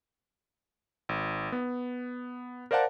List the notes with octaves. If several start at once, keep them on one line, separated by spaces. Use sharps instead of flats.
G#1
B3
A#4 C5 D5 F5 F#5 A5